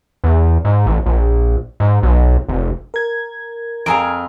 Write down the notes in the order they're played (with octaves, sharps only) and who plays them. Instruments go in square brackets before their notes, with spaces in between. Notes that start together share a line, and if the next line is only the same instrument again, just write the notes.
[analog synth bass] E2
G#2
A1
A#1
G#2
B1
F1
[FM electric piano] A#4 G#6
[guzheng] F2 G#4 F5 [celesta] G#5 A#5 D7